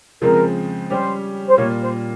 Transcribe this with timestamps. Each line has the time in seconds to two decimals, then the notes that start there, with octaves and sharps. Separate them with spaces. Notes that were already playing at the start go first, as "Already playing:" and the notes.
0.21 C#3 F3 G#3 C4 A#4
0.90 G3 C#4 G4 C5
1.47 C5
1.58 A#2 G3 A#3 F4 C#5
1.81 C5